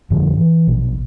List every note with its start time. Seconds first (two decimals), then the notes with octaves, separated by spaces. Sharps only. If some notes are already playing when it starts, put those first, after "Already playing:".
0.10 F2 A2 D3 F3
0.37 E3
0.67 A#1 B2